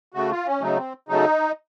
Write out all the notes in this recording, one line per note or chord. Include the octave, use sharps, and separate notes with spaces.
C#3 A3 F#4
F4
C#4
C#3 F#3 A3 D#4
C4
C#3 F#3 A3 D#4